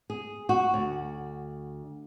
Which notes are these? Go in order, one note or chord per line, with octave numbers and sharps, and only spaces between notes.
G#4
F#4
D2